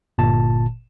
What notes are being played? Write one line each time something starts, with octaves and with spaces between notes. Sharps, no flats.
G1 A#2 A5